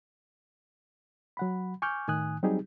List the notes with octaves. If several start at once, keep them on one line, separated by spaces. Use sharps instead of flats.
F#3 F#5 B5
G#5 C#6 D6 F6 G6
A2 D#3 G#5 D#6 F#6
F#3 G3 C4 D#4 G4 G#4